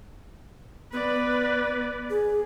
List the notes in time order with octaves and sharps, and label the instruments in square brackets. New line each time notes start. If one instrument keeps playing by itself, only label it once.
[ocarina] B3 [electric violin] B4 D5
[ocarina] G#4